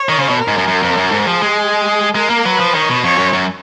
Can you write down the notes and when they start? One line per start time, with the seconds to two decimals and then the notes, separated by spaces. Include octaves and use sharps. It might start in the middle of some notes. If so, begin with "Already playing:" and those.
Already playing: C#5
0.09 D#3
0.19 C#3
0.29 B2
0.39 A#4
0.48 G#2
0.58 F#2
0.68 F#2
0.83 F2
0.97 F#2
1.12 G#2
1.27 F3 G#4
1.42 G#3
2.15 G#3 A#4
2.30 A#3
2.45 F#3 B4
2.60 F3
2.74 D#3 C#5
2.89 B2
3.03 F2 C#5
3.18 F#2
3.33 F#2